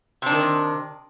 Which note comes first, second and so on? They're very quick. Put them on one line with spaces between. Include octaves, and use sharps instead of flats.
C3 D4 D#3